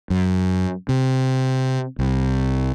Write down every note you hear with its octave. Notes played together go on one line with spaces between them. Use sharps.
F#2
C3
C2